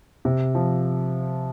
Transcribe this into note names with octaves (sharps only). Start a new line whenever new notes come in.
C3
F3